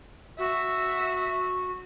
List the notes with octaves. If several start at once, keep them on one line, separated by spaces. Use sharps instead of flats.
F#4 E5